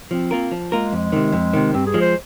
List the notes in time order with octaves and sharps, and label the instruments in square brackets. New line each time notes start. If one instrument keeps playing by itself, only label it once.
[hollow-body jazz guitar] F3 [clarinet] C4
[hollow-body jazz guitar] A#3 F4 A#4
F3
[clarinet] G#3 [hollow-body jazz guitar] A#3 F4 A#4
[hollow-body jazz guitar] F2
C3 D#3
F2
C3 D#3
[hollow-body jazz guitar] G2 [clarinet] C4
[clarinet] G#4
[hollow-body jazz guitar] F3 G#3
[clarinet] C5